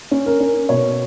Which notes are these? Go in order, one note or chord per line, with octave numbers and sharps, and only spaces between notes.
C#4
A#4
C#4
B2 C#5